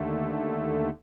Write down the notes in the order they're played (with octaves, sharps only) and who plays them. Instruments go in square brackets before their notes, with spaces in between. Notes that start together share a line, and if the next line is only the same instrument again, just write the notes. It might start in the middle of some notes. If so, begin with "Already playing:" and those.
Already playing: [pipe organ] D#2 D3 A3